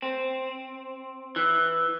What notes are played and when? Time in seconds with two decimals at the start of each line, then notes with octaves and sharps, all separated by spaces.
0.02 C4
1.36 E3